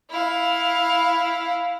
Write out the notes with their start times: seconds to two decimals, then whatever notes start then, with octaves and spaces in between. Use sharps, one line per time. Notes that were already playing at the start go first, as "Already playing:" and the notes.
0.11 E4 F5